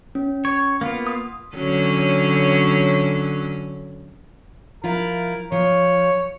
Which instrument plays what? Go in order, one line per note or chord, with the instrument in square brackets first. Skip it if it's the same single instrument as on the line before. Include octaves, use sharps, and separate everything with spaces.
[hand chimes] C#4
[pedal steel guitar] C#5
A#3 B3 F4
[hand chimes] D#6
[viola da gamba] D3 F#3 C#4
[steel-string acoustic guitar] F3 E4 F4 [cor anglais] A#4
[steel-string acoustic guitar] F3 [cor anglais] C#5